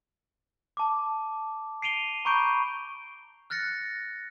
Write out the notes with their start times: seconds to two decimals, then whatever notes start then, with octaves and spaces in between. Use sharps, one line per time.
0.77 A5 D6
1.82 C7 D7 D#7 F7 G7
2.25 A#5 B5 C#6 D6 G6 D7
3.50 F6 F#6 A6 A#6 C#7